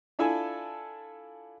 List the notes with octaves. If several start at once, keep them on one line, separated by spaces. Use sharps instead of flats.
D4 E4 F4 A4 G#5 E6